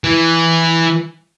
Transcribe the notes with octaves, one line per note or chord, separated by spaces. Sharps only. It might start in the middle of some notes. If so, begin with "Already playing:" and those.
E3